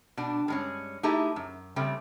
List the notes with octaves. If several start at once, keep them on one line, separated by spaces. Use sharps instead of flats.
B2 D4
G2 G#3 C#4
A3 D#4 E4 G4 G#4
F#2
C#3 G3 A3 C4